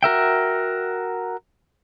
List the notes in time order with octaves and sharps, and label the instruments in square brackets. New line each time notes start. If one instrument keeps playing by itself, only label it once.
[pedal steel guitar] F#4 A#4 E5 G5